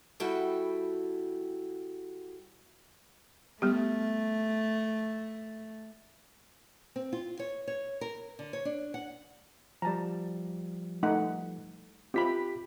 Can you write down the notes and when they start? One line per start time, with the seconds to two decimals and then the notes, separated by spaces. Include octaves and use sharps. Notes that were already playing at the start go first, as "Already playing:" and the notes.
0.20 G3 E4 F#4 A4 G5
3.62 G3 A3 B3 G4
6.96 C4
7.13 F4
7.39 C#5
7.67 C#5
8.01 A#4
8.39 D3
8.53 C#5
8.65 D4
8.94 F#5
9.82 F3 G3 A5 A#5
11.03 A3 D#4 F#5
12.14 C4 F4 G4 B5 B6